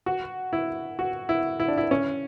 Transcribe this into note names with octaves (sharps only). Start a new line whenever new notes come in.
F#4
E4
F#4
E4
E4
D4
E4
C#4